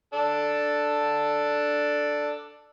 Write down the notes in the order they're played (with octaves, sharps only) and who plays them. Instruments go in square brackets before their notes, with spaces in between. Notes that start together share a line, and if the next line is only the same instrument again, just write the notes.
[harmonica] D4 A4